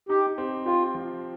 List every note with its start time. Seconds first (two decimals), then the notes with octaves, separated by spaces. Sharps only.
0.09 D#4 G4
0.38 C4
0.66 F4 G4
0.94 F3